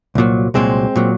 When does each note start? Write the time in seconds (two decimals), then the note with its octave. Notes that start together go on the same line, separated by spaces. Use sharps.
0.15 C2 A#2 F#3
0.54 C2 A#2 F#3 G#3 C4
0.96 A#2 F#3